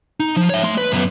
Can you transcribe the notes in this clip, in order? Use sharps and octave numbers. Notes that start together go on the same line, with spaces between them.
D#4
F3
C#5 E5
A3 C6
B4
F#2 B3